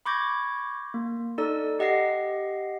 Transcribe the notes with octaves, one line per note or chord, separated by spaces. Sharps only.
B5 C#6 D6 G6 G#6 A#6
A#3
D#4 A4 D5 E6
G4 D#5 F#5 A#6 C7